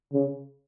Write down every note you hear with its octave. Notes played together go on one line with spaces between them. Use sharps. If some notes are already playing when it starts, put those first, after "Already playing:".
C#3